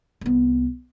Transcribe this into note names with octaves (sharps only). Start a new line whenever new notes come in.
C2 B3